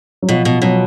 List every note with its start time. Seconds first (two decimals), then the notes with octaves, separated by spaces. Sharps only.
0.22 F#3
0.29 B2 F3
0.45 B2
0.62 B2 F#3